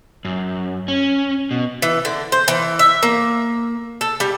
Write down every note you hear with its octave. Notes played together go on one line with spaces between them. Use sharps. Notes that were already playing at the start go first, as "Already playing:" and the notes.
F#2
C#4
B2
E3
D3
C5
E3
E5
A#3
A4
G3